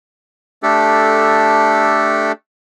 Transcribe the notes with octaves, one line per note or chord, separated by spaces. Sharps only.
A3 D4 G4 A4